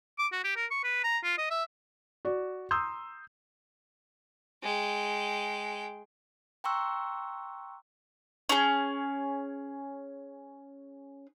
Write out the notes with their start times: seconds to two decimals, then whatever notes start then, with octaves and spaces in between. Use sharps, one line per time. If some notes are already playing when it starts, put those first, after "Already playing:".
0.19 D6
0.32 F#4
0.44 G4
0.56 A#4
0.71 C#6
0.84 B4
1.04 A#5
1.24 F4
1.38 D#5
1.50 E5
2.25 F#4 D5
2.71 A#5 C6 D#6 E6 G6
4.63 G#3 G5
6.64 G5 A#5 C6 C#6 E6 F#6
8.49 C#4 G#4